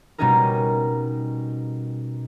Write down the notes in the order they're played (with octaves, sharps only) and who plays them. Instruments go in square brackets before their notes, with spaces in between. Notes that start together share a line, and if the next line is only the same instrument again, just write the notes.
[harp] B2 G3 C#4 D#4 G#4 A#4